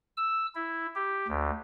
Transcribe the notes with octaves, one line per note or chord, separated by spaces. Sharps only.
E6
E4
G4
D2